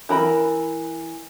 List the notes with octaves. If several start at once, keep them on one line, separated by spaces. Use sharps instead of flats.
E3 A#4 B5